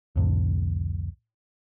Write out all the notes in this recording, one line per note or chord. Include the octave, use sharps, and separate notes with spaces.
C2 F2 A2 D3